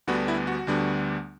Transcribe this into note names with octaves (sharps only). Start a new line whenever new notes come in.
D2 D3 G3 B3 D4 F#4
E4
F#4
D2 D3 G3 B3 D4